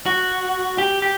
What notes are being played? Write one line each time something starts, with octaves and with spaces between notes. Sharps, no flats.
F#4
G4
G4